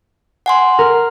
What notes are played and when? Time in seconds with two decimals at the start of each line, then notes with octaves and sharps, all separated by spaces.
0.46 F#5 G#5 C6
0.79 A#4